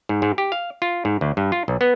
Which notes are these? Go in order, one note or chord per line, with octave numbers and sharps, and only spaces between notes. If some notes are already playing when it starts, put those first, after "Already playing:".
G#2
G#2
G4
F5
F4
G#2
D2
G2
F4
B1
B3